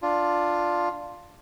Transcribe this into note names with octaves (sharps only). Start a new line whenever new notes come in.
D4 F4